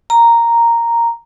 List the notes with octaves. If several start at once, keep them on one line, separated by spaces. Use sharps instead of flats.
A#5